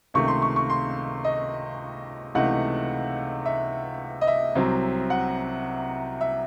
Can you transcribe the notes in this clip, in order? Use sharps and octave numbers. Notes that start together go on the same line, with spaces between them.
C#2 C3 D#3 A3 C#6
C6
C#6
C#6
C6
D#5
C#2 C3 E3 A3 D#4 F#5
E5
D#5
E5
C2 C3 F#3 C4
F#5
E5